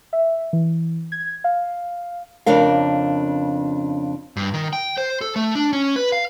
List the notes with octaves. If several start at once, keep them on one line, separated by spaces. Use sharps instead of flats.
E5
E3
G#6
F5
F2 C#3 D4 A#4 F5
G2
D#3
G5
C5
A4
A3
D4
C#4
B4
F5